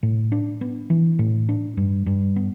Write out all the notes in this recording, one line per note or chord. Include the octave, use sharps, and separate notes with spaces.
A2
D4
B3
E3
A2
D4
G2
G2
B3